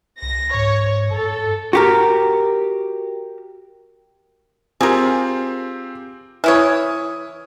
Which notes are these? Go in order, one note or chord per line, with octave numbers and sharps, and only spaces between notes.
C2 A#6
G#2 C#5
G2 A4
F#4 G4 A#4
C4 F4 G4 G#4 A#4
E3 E4 C#5 D#6 F6